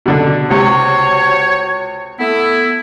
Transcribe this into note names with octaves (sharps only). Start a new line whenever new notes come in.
B2 D3 D4
C#2 C3 F#4 C5 C#5
A3 B3 E4